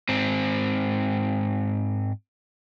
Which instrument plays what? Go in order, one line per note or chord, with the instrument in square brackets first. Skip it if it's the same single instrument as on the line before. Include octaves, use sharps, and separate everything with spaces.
[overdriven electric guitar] G#2 C4